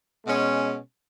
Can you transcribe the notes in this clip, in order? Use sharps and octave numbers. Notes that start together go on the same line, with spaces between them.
B2 G#3 C#4